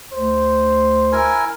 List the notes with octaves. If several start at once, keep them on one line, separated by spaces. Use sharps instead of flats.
D2 C5
E4 A#4 G#5